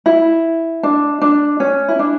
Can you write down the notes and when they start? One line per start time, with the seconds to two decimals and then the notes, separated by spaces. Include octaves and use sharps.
0.06 E4
0.83 D4
1.22 D4
1.60 C#4
1.89 E4
1.99 D4